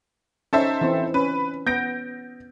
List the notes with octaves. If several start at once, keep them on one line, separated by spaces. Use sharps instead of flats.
C#4 D#4 A4 C5 E5
E3 C4
C#4 B4
B3 G6 A#6 D7